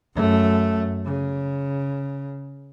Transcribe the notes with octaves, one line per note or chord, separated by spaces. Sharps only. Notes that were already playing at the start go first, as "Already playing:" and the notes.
F#2 A3
C#3